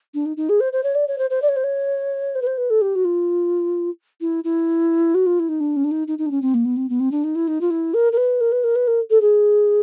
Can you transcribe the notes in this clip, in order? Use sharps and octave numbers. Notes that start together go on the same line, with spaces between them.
D4
D#4
D#4
G#4
C5
C5
C#5
D5
C#5
C5
C5
D5
C#5
C5
C#5
C5
B4
C5
B4
A4
G4
F#4
F4
E4
E4
F#4
F4
E4
D#4
D4
C#4
D4
D#4
D#4
D#4
D4
C#4
C4
A#3
B3
C4
B3
C4
D4
D#4
E4
D#4
F4
E4
A#4
A#4
B4
A#4
B4
A#4
B4
A#4
A4
G#4